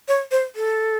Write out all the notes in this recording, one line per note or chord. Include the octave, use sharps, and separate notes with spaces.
C#5
C5
A4